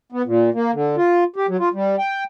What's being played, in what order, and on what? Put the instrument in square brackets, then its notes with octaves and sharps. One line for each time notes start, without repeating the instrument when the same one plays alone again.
[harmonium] B3
A#2
A#3
D3
F4
G4
F#3
F4
G3
G5